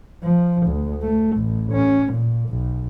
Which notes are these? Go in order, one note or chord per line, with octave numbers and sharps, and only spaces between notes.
F3
D2
A3
A1
C#4
A#2
B1